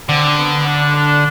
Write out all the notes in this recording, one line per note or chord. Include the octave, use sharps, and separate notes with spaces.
D3 C4
B3
D4
D4